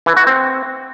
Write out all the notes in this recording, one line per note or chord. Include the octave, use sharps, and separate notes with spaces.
E3
F#4
C4